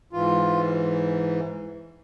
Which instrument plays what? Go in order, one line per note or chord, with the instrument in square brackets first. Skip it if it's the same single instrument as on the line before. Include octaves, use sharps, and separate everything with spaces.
[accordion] G#2 E3 F4